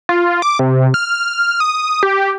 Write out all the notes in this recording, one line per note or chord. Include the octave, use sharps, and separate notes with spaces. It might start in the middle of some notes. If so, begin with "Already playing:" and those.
F4
D6
C3
F6
D#6
G4